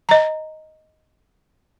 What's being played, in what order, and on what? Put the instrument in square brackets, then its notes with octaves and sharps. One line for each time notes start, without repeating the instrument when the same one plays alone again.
[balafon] D#5 A#5